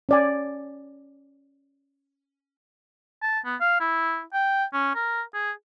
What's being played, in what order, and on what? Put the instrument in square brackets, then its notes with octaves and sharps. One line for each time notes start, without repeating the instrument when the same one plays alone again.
[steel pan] C#4 D5 G#5
[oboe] A5
B3
F5
E4
G5
C#4
A#4
G#4